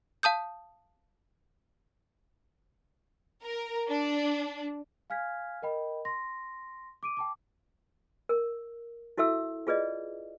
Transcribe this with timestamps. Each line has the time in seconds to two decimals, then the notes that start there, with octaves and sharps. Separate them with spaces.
0.23 F5 A5 D#6 G6
3.44 A#4
3.89 D4
5.10 F5 G#5 F6 G#6 B6
5.62 A#4 D#5 G5 B5
6.05 C6 A#6
7.03 D6 D7 D#7
7.17 G5 A5 D6
8.29 A#4
9.18 E4 F#4 A4 E5 E6
9.67 F4 G#4 B4 D5 D#5